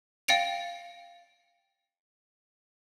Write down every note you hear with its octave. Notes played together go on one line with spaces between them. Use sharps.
F5 G5 A6 C#7 D7 F7